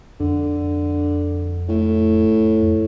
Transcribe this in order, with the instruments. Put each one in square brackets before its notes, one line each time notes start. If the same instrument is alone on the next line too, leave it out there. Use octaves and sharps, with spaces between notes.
[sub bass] F2 [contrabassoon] D3
[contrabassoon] A2
[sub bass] F2